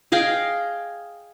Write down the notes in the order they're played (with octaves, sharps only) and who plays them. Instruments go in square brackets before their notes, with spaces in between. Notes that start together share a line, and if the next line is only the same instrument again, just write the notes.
[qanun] G#4 D#5 F5 G5